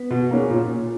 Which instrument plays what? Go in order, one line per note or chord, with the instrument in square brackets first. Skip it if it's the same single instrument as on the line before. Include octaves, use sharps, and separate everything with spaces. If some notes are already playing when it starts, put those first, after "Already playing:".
Already playing: [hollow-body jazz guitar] B3
[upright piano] B2
A#3 C#4 G#4
A#2